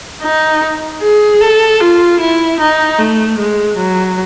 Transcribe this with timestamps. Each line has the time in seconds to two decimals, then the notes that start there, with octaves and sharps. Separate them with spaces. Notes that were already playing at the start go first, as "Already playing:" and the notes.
0.22 D#4
1.02 G#4
1.41 A4
1.80 F4
2.20 E4
2.60 D#4
2.99 A3
3.39 G#3
3.77 F#3